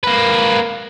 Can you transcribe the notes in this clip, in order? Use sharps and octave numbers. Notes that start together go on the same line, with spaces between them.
A#3 B4